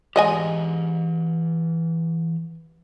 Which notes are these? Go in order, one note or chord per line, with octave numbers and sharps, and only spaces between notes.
E3 G#3 G4 D#5 G#5